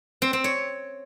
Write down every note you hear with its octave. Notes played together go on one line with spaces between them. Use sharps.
C4
C4
C#5